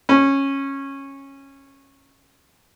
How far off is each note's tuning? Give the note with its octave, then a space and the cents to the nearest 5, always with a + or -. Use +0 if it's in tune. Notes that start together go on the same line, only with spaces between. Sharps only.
C#4 -15